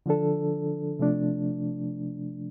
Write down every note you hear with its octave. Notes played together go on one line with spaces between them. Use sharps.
D3 F3 D4 A4
C3 F3 A3 D4